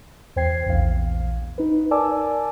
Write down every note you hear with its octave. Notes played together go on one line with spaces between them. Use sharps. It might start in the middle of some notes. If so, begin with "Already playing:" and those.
E2 C5 G5 G#6 C7
A#1 E2 F5
D#4 B4
A#4 D5 G#5 A5 D6 E6